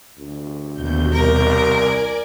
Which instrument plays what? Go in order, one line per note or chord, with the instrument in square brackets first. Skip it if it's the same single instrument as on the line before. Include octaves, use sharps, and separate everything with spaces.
[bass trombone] D2
[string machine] D#2 B2 G6
[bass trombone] C2 [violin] A#4
[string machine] D5 G#5